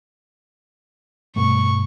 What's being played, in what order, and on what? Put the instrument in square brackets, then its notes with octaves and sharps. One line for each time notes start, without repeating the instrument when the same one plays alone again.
[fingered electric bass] G2 B2 A3 [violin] C#6